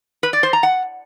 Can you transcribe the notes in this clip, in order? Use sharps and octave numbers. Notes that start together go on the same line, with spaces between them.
B4
D5
C5
A#5
F#5